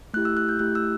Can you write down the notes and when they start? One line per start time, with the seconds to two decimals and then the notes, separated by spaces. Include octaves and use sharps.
0.14 A3 E4 G4 F#6
0.25 E6
0.37 F#6
0.49 G6
0.59 A3 E4 G4 F#6
0.75 E6